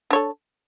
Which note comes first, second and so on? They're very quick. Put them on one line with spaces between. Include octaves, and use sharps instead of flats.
D4 C#5 A4